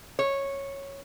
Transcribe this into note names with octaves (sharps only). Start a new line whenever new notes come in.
C#5